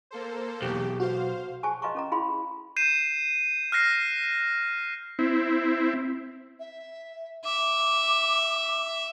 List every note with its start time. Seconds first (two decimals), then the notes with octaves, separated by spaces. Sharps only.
0.11 A#3 A4 C5
0.62 B1 E2 G4
1.00 F#4 C5 F5
1.63 G#4 C5 G#5 A5 C#6
1.82 B4 D#5 F5 A#5 C6 C#6
1.95 C#4 A4 A#5
2.12 E4 G#4 F5 B5 C6
2.76 G6 C7 D#7 E7
3.72 F6 F#6 A#6 C7
5.19 C4 E4
6.59 E5
7.45 E5 D6